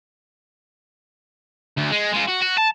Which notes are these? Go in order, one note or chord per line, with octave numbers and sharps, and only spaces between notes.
D2
G#3
G#3 F4
F#4
F#4
A5